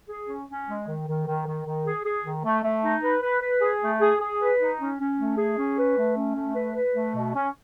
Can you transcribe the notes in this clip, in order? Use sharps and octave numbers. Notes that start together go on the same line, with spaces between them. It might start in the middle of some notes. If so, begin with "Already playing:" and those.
G#4
C#4
C#4
G#3
D#3
D#3
D#3
D#3
D#3
G#4
G#4
D#3
A3
A3
D#4
B4
B4
B4
G#4
A3
G#4
G#4
B4
D#4
C#4
C#4
A3
G#4
C#4
B4
A3
C#4
A3
B4
B4
A3
B2
C#4